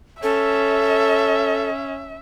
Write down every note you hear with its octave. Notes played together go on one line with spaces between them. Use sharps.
C#4 A4 E5